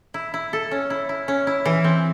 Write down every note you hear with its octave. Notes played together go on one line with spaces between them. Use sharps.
E4
E4
A4
C#4
E4
E4
C#4
E4
E3
C4